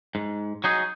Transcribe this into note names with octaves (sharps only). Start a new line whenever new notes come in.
G#2
F#3 D#4 G#4